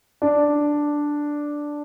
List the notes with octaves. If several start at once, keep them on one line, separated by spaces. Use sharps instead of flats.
D4